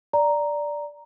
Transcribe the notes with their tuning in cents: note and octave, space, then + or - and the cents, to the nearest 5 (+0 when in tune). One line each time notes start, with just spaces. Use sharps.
D5 +0 A#5 +0